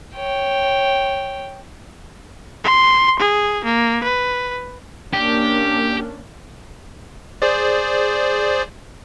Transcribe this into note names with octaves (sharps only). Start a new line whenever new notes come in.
C#5 G5
C6
G#4
A#3
B4
A#3 C#4 D4 G4
G#4 C5 D5